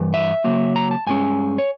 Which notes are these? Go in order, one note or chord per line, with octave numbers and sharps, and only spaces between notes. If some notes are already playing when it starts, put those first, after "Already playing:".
Already playing: G2 E3
E5
C#3 F#3 A#3
A#5
A5
G2 D#3 G#3 C#4 G#5
C#5